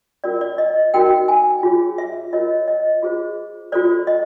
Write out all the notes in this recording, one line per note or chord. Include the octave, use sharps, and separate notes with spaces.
C#4 F4 A#4 D5
D5
D#5
D#4 F#4 A#4 G5
G#5
F4 G#4 C#5
E5
F4 A#4 C#5 D#5
D#5
F4 G#4 C5
F4 A4 C5 D5
D#5